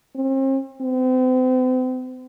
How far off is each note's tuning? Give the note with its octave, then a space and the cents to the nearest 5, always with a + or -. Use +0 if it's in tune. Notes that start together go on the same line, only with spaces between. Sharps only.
C4 +40
C4 -40